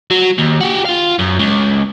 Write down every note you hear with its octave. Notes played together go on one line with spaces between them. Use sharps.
F#3
D#2
F#4 G4
F4 F5
F#2
C#2